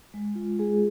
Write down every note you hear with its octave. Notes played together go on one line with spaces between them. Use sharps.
G#3
F4
G#3 G#4